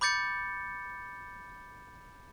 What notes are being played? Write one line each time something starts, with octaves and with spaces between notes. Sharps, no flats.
B5 D6 G6 A6 C#7